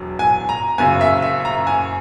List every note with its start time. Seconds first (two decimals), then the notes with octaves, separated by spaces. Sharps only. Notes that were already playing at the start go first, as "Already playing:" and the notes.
Already playing: E1 E2 F#3
0.19 G#5
0.49 A#5
0.78 F#1 F#2 C#3 G#5
1.01 E5
1.22 E5
1.45 A#5
1.67 G#5